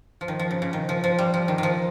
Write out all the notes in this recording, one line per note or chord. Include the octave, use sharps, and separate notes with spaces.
F3
D#3
F3
C#3
C#3
D#3
F3
F3
G3
F3
D#3
D#3 F3